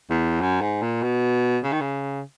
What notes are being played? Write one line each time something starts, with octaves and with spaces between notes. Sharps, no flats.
E2
F#2
G#2
A#2
B2
C#3
D#3
C#3